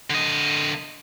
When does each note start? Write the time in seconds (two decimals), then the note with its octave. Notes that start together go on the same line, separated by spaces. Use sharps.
0.10 D3 D#5